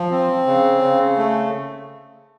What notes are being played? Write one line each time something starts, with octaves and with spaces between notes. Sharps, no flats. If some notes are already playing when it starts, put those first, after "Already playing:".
Already playing: F3
C4
C#3
C#3
A3